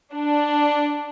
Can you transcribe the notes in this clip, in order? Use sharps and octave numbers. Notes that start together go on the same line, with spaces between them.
D4